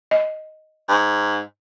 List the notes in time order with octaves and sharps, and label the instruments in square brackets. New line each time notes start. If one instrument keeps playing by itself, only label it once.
[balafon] D#5
[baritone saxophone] G#2